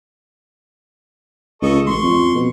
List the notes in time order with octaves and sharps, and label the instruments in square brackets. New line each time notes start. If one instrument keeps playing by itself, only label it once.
[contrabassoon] C#2 [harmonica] A4 D#5 C#6
[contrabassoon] A1 [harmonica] C6 C#6
[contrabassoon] F2
B2